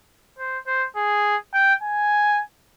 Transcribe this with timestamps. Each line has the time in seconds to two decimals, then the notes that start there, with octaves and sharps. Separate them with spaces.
0.38 C5
0.67 C5
0.96 G#4
1.54 G5
1.82 G#5